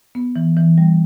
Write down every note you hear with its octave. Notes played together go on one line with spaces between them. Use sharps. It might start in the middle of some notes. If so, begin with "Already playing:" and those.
B3
E3
E3
G3